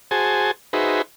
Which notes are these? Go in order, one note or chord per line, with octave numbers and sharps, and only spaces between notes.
F#4 G#4 C5 G#5 A5
D#4 F#4 G#4 B4 C5 E5